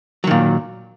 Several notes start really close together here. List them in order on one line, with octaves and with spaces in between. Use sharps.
F#3 D#3 A#2